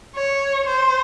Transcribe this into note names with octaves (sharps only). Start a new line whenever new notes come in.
C#5
C5